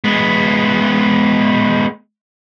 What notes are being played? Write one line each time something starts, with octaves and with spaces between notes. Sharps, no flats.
G#3 B3